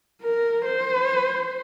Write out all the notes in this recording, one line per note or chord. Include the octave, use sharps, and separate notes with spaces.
A#4
C5